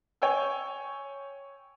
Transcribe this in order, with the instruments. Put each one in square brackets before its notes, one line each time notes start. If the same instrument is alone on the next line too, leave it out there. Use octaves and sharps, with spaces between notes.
[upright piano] C#5 G5 G#5 E6